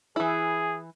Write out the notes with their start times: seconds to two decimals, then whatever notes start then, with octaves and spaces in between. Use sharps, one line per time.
0.16 E3 E4 G#4